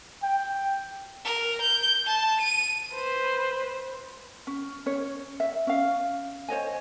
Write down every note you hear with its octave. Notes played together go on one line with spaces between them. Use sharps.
G5
A#4
G6
A5
D#7
B4 C5
C#4
C#4 C#5
E5
C#4 F5
C5 C#5 D#5 G#5